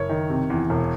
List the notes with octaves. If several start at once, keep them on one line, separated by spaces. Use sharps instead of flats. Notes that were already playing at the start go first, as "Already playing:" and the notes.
Already playing: F#1 C#5
D#3
C3
E2
E1